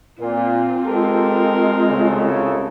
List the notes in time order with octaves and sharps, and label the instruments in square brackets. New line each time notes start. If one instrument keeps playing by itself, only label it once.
[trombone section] A#2 [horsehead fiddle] C4 F4
[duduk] G#3 [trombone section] G4 A4 [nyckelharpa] A#4
[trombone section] C2 C#3 A4